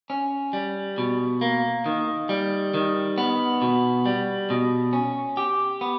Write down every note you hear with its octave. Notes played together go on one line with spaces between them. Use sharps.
C#4
G3
B2
A#3
D#3
G3
D#3
B3
B2
G3
B2
C#4
G4
B3